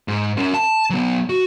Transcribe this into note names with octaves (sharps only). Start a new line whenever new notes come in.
G#2
C#4 A#4
A5
F#3 B3
F#4